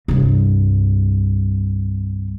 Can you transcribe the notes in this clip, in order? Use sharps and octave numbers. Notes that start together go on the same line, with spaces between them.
C2 G2